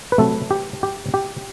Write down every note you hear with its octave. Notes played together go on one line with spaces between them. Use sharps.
B4
C3 F#3 A3 C4 A4
G4
G4
G4